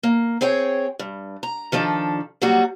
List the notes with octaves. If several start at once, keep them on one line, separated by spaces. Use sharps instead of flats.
A#3
C4 G#4 C#5 G5
G2
A#5
D#3 F3 D4 A4
F#3 G3 A#3 F#4